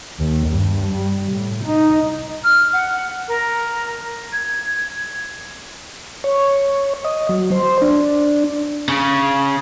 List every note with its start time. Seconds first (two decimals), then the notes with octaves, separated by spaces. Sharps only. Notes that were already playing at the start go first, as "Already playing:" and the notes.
0.19 D#2
0.47 G2
0.94 G3
1.32 A2
1.64 D#4
2.44 F6
2.73 F#5
3.28 A#4
4.32 G#6
6.24 C#5
7.04 D#5
7.29 F#3
7.52 C5
7.82 D4
8.88 C#3